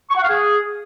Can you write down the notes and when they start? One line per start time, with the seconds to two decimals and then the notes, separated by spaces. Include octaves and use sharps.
0.11 C#6
0.17 F#5
0.23 F5
0.29 G#4